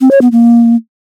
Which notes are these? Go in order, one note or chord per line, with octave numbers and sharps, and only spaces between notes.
C4
C#5
B3
A#3